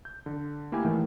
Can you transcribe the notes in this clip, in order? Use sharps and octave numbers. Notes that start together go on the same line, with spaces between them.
G6
D3
A3 A#3 E4 G4 A#4 G#5
A2 D#3 E3 A3 A#3